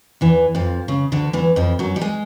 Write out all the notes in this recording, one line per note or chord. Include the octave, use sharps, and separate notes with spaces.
E2 E3
F2 F3
C#3
D2 D3
E2 E3
F2 F3
F#2 F#3
G3
G#3